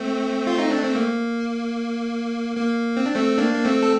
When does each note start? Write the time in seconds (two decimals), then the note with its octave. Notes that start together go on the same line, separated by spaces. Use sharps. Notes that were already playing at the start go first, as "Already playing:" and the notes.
Already playing: A3 C4
0.47 F4
0.58 D#4
0.71 D4
0.83 C4
0.95 A#3
2.57 A#3
2.97 C4
3.06 D4
3.15 A3 C4
3.38 A#3 D4
3.53 A#3
3.65 A3 C4
3.83 A4